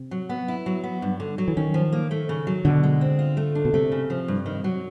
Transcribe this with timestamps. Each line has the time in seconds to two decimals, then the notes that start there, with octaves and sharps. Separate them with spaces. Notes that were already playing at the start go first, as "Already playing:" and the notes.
Already playing: C3
0.11 F#3
0.29 B3
0.48 E4
0.66 F#3
0.84 B3
1.02 G2
1.20 D3
1.38 F#3
1.48 E3
1.57 D#3 C#4
1.74 F3
1.93 A#3
2.11 A3
2.29 C#3
2.47 F#3
2.65 B2 D3
2.83 G#3
3.01 C4
3.19 F4
3.37 A3
3.55 D4
3.65 B2
3.73 C3 A3
3.92 C#3
4.10 F3
4.28 G2
4.46 D#3
4.64 F#3